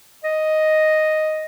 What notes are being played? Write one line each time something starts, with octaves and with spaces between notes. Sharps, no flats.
D#5